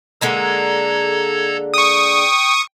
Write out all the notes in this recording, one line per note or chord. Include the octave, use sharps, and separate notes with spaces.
D3 G#3 A#3 A4 A#5 G#6
G5 C#6 D#6